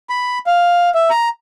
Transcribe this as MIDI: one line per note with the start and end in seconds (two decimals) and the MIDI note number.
0.10 0.38 83
0.47 0.90 77
0.95 1.10 76
1.10 1.29 82